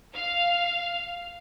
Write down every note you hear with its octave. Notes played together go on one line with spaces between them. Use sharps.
F5